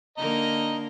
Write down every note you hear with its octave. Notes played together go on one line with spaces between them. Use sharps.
D3 A#3 A#4 D#5 A#5